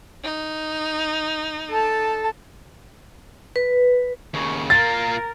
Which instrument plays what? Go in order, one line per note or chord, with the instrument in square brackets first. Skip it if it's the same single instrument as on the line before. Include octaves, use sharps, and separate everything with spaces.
[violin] D#4
[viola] A4 A5
[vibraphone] B4
[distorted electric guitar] D#2 C#3 [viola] C#6
[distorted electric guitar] A#3 F4 [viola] A#4 [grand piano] A6